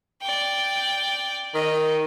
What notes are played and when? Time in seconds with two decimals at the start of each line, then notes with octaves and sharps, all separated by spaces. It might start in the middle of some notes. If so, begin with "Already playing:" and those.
0.21 D5 G5
1.54 D#3 D#5